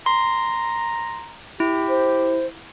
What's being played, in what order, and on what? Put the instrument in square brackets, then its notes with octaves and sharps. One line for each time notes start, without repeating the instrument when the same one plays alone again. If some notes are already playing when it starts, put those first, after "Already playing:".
[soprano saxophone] A#5 [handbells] C6
[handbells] E4 [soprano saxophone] G4
[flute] C5